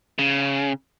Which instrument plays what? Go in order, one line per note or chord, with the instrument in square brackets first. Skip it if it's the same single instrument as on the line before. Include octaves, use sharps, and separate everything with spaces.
[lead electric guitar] C#3